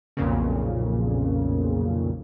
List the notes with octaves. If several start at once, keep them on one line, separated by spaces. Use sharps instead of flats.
B1 F2 A#2 C#3